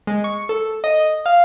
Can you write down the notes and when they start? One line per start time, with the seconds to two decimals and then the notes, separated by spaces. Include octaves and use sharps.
0.07 G#3
0.24 C#6
0.49 A4
0.84 D#5
1.26 F5